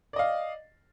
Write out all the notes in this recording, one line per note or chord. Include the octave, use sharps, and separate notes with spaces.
D5 D#5 F5